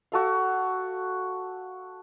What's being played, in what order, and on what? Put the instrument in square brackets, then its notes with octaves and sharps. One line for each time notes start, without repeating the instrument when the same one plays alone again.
[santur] F#4 A4 F5